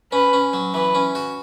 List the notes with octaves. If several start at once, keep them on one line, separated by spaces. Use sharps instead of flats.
C#4 B4
C#4
F#3
E3 B4
C#4
F#4